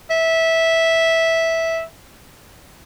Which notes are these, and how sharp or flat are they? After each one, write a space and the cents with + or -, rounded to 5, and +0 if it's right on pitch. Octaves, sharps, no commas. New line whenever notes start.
E5 -10